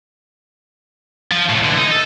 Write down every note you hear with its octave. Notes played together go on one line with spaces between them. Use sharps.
F3
C#2 A2
D3 E3
D#4
A4